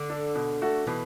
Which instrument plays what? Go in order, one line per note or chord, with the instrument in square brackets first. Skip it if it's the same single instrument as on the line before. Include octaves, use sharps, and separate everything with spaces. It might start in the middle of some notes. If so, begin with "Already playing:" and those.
Already playing: [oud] D3
[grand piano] D4 A4
B2
A3 F#4 A4
[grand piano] B2 [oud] E3